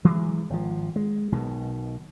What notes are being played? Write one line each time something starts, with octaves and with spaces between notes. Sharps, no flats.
E3 F#3 G#3
G#1 F3
G#3
B1 B2 D#3